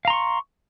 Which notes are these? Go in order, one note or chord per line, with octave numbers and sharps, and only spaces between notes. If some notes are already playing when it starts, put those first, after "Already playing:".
F5 A#5 C6 C#6